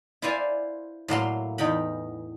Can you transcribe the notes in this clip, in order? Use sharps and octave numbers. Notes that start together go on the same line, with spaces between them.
E4 F4 C5 D5 F5 G#5
A2 F#3 A#3 C6
E2 D#4 G5 B5